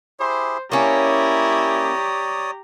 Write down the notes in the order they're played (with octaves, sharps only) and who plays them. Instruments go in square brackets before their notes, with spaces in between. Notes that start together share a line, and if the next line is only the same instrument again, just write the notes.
[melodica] E4 G4 G#4 [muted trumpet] C5
[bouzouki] A#3 C#4 [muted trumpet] E4 [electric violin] G4 A#5 [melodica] C#5 D5 D#6